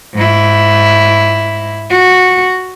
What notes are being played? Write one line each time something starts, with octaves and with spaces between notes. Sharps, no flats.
G#2 E4
F#4